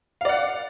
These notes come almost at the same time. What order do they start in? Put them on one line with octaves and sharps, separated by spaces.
F5 D5 F#5